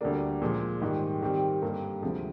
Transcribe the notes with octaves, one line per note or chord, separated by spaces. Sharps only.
D2 D3 G3 A#3 D4
A#2 F3 G#3
G#2 D#3 G3
D#3 G3 C4 G4
G2 D3 G3 A#3
D2 C3 F3 G#3